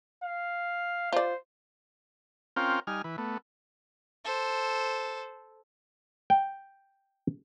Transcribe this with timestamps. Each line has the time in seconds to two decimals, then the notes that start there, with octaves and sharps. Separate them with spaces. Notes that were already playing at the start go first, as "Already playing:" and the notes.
0.24 F5
1.13 F4 C5 D5
2.56 C4 C#4 F4 A#4 F5 G5
2.87 G3 D#4 G#5 F6
3.04 E3 B4
3.18 A3 B3
4.25 A4 C5
6.30 G5